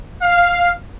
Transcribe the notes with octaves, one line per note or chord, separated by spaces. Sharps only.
F5